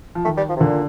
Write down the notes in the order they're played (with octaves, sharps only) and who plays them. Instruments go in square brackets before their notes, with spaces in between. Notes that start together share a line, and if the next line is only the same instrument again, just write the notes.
[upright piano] F3
[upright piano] D#3 [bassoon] A3
[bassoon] G3
F3
C3
[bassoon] A#2 [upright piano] D3